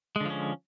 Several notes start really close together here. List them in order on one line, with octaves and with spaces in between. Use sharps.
G#3 D3 F3 C#4